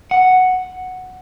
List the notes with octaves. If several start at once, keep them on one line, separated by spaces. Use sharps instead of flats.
F#5